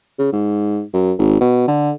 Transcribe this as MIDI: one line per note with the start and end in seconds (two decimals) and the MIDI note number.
0.19 0.32 49
0.33 0.82 44
0.93 1.12 42
1.18 1.36 32
1.41 1.66 47
1.68 1.91 50